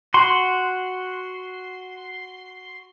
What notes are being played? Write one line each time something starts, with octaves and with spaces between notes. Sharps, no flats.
F#4 C6